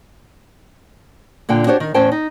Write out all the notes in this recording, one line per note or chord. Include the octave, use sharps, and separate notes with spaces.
A#2 D3 D4 G5
D4 F#4 G4 C5 C#5
D#3
E2 A2 C#4 C5 G5 A5
D#4